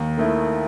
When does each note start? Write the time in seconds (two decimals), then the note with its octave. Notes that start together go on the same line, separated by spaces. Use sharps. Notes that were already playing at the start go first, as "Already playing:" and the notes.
Already playing: D#2
0.17 D#3 A3 E4